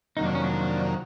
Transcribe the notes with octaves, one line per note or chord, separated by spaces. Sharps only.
F2 C3 D#3 F#3 A#3 D#4
D4
C#4
D4